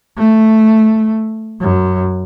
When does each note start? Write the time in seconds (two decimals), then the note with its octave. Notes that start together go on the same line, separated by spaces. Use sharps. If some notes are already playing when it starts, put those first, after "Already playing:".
0.17 A3
1.61 F#2